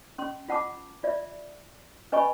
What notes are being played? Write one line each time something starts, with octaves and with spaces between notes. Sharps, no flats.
C#4 C6
F4 F#5 A5 D6
F4 D5 E5
C#4 B4 D#5 G#5 B5 C#6